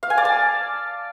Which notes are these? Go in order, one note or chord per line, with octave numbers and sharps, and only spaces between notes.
F5
G#5
D5
A5